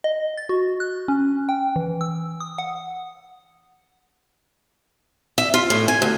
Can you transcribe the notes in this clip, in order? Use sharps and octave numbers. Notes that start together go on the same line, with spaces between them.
D#5
A6
F#4
F#6
C#4
G5
E3
E6
D#6
F#5
E5
F4
A2
G#5
D2